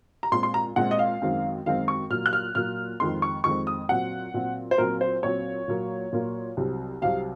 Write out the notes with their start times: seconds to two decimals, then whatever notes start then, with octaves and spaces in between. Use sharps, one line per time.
0.23 A#5
0.32 A#2 G#3 C4 C6
0.43 C6
0.54 A#5
0.76 A#2 G#3 C4 F#5
0.91 D#5
0.99 F5
1.22 F#2 D#3 G#3 C4
1.66 F#2 D#3 G#3 C4 F5
1.88 C#6
2.10 A#2 F#3 A#3 F6
2.26 F#6
2.33 F6
2.55 A#2 F#3 A#3 F6
3.00 F2 D#3 G#3 C4 C6
3.22 C#6
3.44 F2 D#3 G#3 C4 C#6
3.67 D#6
3.89 A#2 F#3 C4 F#5
4.34 A#2 F#3 C4
4.71 C5
4.78 A#2 F#3 C4 A#4
5.01 C5
5.23 A#2 F#3 C4 C#5
5.68 A#2 F#3 A#3
6.13 A#2 F#3 A#3
6.57 C2 C3 F#3 C4
7.02 C2 C3 F#3 C4 F5